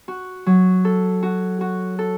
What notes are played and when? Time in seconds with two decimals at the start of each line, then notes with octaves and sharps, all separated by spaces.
0.08 F#4
0.46 F#3
0.85 A4
1.23 F#4
1.61 F#4
1.99 A4